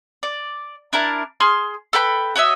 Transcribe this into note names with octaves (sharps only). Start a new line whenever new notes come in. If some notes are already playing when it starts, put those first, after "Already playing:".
D5
D4 E4 A#4 A5
G#4 C6 F6
A4 B4 G5 B5
F#4 C#5 D#5 E5